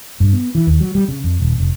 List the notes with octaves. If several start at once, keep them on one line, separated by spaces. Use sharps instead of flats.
G2
B3
E3
D#2
F#3
G3
C#3
F2
D#1
F1